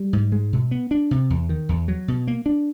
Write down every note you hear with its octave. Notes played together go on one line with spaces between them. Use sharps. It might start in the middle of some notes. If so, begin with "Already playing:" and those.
Already playing: G3
G#2
G#3
B2
B3
D4
C3
E2
D#3
E2
F#3
B2
A#3
D4